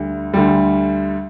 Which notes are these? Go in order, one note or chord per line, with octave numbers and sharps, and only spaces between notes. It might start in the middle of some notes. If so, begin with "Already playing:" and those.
Already playing: D2 D3 G3
D2 D3 G3